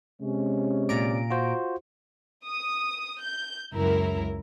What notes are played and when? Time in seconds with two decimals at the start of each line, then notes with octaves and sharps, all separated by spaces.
0.22 C3 G#3 C#4
0.89 A#2 D5 A#5 D7
1.30 F4 F#4 C5
2.45 D#6
3.22 G6
3.74 C#2 F#2 E4 A#4